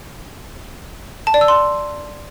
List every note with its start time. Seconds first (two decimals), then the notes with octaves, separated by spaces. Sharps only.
1.27 A5
1.34 D5
1.41 E6
1.48 C6